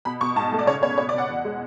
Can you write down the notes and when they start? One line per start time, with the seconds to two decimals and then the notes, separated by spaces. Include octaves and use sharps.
0.05 B2 B5
0.21 B2 C#6
0.36 G#2 A5
0.52 A3
0.59 D5
0.67 C#3 C#5
0.82 B3 C#5
0.98 B2 C#5
1.09 D5
1.14 B2 F#5
1.29 E2
1.45 G#3